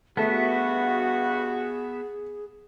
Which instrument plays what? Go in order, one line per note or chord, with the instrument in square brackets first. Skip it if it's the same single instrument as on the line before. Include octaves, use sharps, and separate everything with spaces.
[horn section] G2 F#4 [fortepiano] A3 [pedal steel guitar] B3 E5 [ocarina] G#4